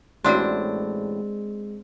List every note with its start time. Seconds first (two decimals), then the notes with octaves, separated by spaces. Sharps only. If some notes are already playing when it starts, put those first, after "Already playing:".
0.24 A1 A2 G#3 C4 D4 F#4 D5 C6